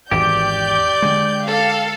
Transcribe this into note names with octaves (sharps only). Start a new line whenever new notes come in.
G#1 E2 G4 D5 G6
D3 G#3
A4 F5